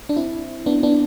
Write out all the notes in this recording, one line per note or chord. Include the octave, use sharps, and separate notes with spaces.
D4
C4 E4
B3 D4
B3 D4